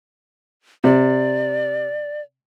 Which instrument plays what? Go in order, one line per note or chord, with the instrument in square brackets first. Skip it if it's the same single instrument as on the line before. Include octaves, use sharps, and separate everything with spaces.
[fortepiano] C3 [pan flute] D5